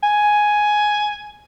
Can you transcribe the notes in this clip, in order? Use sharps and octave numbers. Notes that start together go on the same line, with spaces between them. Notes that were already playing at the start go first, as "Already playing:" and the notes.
G#5